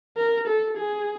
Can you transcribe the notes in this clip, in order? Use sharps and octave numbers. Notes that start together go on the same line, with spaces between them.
A#4
A4
G#4